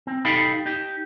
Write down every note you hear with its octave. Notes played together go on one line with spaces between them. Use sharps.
C4
D#4 G4 A4 F5 G5 B5
D#4 G4